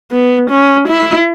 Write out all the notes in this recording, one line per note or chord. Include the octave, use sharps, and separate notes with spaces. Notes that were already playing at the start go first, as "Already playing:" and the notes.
B3
C#4
E4